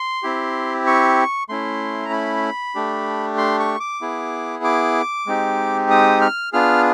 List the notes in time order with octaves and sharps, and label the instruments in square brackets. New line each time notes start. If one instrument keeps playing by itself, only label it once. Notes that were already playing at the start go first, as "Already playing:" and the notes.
Already playing: [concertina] C6
C4 E4 G4
C#6
A3 C#4 E4 C6
A#5
B5
A3 D4 G4
C6
C#6
D6
B3 E4 G#4
D6
G#3 C4 D#4 G4
D#6
F6
B3 D4 F4 G#4 F6